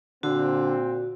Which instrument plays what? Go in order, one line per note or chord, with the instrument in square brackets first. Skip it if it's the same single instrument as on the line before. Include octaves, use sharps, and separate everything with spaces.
[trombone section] A#2 C4 [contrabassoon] D3 [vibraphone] F#4